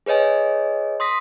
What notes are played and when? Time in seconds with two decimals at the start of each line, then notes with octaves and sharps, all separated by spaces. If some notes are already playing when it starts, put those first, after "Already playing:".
0.06 G#4 B4 C#5 D#5 G#5
1.00 C6 D#6 A#6 B6